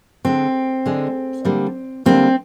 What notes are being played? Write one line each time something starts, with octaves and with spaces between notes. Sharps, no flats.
D3 G#3 C4
D3 G#3
D3 G3 A#3
D3 G3 A#3 C4